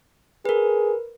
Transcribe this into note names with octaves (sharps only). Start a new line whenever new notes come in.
G#4 A#4 B4